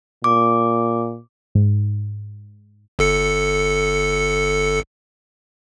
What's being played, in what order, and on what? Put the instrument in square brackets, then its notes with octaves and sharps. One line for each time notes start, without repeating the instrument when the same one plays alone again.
[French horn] A#2 [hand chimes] D6
[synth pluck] G#2
[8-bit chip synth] G1 A4 C#7